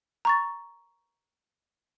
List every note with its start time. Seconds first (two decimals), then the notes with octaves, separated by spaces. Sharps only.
0.25 A#5 C#6 A6